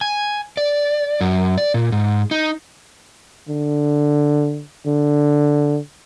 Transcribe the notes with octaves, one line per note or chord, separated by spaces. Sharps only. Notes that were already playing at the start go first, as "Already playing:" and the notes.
G#5
D5
F#2
D5
A#2
G#2
D#4
D3
D3